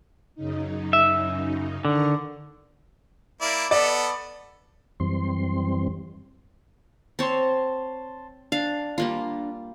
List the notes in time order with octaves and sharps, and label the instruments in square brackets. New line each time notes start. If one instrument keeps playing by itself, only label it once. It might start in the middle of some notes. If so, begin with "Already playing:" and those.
[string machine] F#2 C#3 D#4
[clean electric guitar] E5
[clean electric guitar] D3 [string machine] D#3 A#4 C#6
[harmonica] A#3 E4 D5
[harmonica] B3 A4 [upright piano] D5
[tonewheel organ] F#2 E3 G3 C4 C6
[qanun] C4 C#5 [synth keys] A5 C6
[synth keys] D4 [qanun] F5
[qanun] G3 A#3 F4